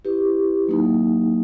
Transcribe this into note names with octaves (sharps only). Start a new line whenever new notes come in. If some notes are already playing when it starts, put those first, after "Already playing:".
E4 G4 B4
F#3 A#3 D#4